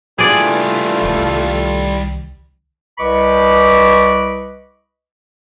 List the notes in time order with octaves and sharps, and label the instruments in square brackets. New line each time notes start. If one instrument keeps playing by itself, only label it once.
[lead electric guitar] E3 G3 [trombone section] A3 F4 A4 [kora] G#4 D5
[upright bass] C2 D#3
[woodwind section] C2 B4 D#5 B5 C#6 D6